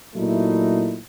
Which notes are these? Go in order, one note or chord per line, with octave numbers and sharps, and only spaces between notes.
A#2 F#3 A3 D#4 E4